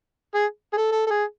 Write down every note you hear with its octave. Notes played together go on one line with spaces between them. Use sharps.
G#4
G#4
A4
A4
A4
G#4